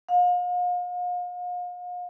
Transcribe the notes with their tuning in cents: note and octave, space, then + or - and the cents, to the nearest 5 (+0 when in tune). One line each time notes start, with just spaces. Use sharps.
F5 +40